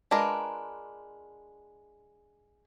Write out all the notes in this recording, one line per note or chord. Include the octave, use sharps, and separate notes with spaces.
G#3 D4 F4 A#4 B4